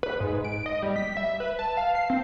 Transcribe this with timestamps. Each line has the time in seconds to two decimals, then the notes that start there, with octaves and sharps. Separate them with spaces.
0.03 B4
0.20 G#2
0.45 D7
0.66 D#5
0.83 G3
0.96 B6
1.17 E5
1.40 B4
1.59 A5
1.77 F5
1.95 C7
2.10 C4